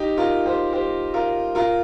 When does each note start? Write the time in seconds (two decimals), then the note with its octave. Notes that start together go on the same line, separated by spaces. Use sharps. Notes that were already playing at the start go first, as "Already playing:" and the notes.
Already playing: D#4 G4
0.17 F4 A#4
0.46 G4 C5
0.73 G4 C5
1.14 F4 A#4
1.55 F4 A#4